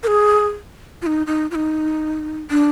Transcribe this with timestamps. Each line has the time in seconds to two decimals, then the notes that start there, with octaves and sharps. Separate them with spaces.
0.03 A#4
0.07 G#4
1.02 F4
1.07 D#4
1.27 D#4
1.51 F4
1.55 D#4
2.50 D4